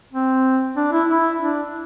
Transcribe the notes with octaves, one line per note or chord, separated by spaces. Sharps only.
C4
D4
E4
E4
D4